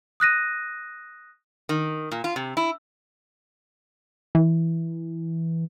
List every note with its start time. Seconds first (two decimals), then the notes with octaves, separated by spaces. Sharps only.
0.20 D#6 F#6 A#6 D#7
1.69 D#3
2.12 A#2
2.24 F4
2.36 C3
2.57 E4
4.35 E3